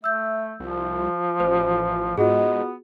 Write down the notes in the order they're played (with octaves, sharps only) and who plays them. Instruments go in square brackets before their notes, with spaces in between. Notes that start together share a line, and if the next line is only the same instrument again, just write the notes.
[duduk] A3 [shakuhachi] E5 [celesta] E6 G6
[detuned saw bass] C2 [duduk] F3 [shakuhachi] F4
[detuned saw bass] A1 [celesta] C5
[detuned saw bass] G#2 [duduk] B3 [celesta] F4 F#4 G#4 [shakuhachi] D#5